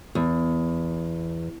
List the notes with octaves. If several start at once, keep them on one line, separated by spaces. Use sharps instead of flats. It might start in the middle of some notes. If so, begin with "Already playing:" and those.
E2